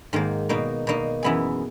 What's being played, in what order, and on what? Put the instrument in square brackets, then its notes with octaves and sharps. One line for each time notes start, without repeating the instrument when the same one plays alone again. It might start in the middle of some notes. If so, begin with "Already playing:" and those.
[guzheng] G#2 D#3 A#3
B2 A#3 D#4
B2 A#3 D#4
F#2 E3 B3 E4 G#4